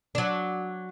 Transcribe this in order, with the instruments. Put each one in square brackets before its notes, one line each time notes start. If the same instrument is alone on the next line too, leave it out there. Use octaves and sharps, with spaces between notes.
[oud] F#3 D4